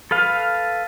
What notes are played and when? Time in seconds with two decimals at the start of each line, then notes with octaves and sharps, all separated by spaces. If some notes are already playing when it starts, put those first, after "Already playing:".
0.11 A4 B4 F5